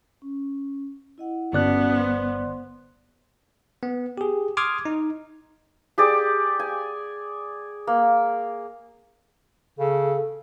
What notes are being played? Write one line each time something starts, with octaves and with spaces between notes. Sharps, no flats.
C#4
E4 D#5 F#5
G1 B3 C#4 F#4 D5 A5 F#6
C5 C6
B3
G4 G#4
C6 D6 D#6 F6 G#6
D#4
G4 G#4 D5
G#5
A#3
C#3 A4